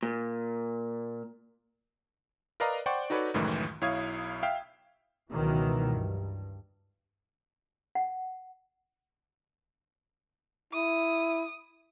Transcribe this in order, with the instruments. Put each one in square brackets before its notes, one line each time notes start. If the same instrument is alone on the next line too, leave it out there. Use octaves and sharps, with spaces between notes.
[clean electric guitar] A#2
[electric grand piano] A#4 B4 D5 D#5 F5 A#5
C5 D5 F#5 G5 C#6
D#4 F#4 A4 B4 C#5 D5
C#2 F#2 A2 D#3 E3
B1 E4 C#5 F5 D#6 G#6
E5 F5 G5
[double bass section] C#2 B2 D#3 E3 F#3
G2
[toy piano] F#5
[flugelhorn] E4 [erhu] D#6